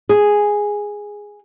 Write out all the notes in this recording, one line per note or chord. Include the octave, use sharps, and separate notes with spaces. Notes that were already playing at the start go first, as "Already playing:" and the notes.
G#4